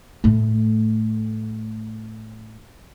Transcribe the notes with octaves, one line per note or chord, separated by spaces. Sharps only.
A2 A3